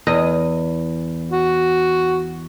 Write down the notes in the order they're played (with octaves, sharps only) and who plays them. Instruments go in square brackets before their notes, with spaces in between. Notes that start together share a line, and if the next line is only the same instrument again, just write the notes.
[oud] E2 D#5
[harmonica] F#4